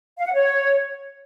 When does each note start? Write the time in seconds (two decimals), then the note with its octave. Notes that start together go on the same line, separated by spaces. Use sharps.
0.19 F5
0.26 F#5
0.33 C#5